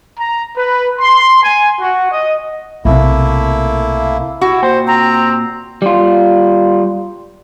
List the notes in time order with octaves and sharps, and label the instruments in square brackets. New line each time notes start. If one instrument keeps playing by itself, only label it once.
[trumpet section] A#5
B4
C6
G#5
F#4
D#5
[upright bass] B1 C3 [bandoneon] A3 A#3 E4
[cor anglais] E4 [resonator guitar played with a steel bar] F#4
[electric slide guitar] A#2 G5 [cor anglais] C5
[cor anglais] C4 [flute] A#5
[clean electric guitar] G3 F4